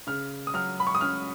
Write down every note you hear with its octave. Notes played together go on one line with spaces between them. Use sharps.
C#3 F6
D#6
F#3 F6
B5
C#6
D#6
C#4 F6